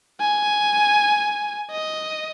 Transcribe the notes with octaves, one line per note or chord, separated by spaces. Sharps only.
G#5
D#5